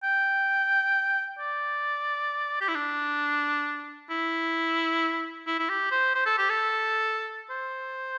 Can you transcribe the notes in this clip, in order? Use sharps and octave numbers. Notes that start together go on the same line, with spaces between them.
G5
D5
G4
E4
D4
E4
E4
E4
G4
C5
C5
A4
G4
A4
C5